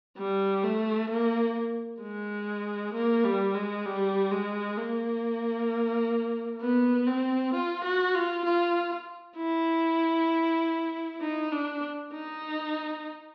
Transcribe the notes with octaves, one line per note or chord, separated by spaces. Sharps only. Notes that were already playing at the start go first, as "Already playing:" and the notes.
G3
A3
A#3
G#3
A#3
G3
G#3
G3
G#3
A#3
B3
C4
F4
F#4
F4
F4
E4
D#4
D4
D#4